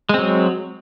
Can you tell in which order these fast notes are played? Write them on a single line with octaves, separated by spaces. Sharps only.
G#3 C4 F#3